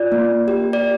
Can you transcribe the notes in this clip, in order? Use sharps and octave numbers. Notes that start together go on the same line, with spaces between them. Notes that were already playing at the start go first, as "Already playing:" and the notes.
Already playing: F4 D5
A#3
G4
D5